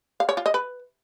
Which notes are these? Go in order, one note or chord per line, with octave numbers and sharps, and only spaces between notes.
F5
C#5
F4
D#5
B4